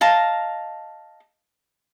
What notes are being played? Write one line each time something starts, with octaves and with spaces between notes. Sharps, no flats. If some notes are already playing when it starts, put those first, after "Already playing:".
D#5 F5 A5 A#5